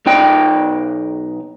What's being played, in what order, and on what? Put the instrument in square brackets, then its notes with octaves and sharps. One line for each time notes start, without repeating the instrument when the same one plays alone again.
[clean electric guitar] B1 D#4 G5